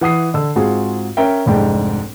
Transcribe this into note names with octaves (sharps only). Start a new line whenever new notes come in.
E3 F#5 D#6 C7
D3 E6
G#2 C4 F4 F#4 G#4
C#4 A#4 E5 G5
F1 C2 G#2 D4 G5